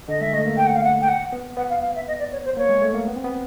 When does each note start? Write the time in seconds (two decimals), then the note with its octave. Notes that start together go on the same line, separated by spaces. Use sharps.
0.08 D3 D#5
0.21 G#3 E5
0.33 A3 D#5
0.46 A#3
0.57 G5
0.67 F#5
0.76 F5
0.84 F#5
1.01 G5
1.08 F#5
1.32 B3
1.57 B3 F#5
1.70 F5
1.82 F5
1.96 E5
2.08 D#5
2.19 D5
2.32 C#5
2.45 C5
2.57 A#3 C#5
2.70 G#3
2.82 A3
2.94 A#3
3.08 B3
3.16 C4
3.24 B3